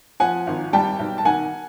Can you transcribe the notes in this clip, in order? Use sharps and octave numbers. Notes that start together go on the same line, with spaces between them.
F3 F#5 G#5
G#1
G3 G5 A5
B1
A5
D#3 F#5 G#5